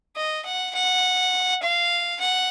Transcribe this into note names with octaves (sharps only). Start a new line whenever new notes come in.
D#5
F#5
F#5
F5
F#5